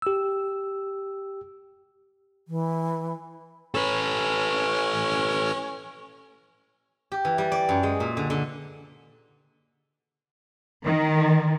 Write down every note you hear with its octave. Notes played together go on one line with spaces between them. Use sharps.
G4 E6
E3
C#4 A4 B4
G4
E3
G3
D5
F#2
G#3
A#2
D3
D3
D#3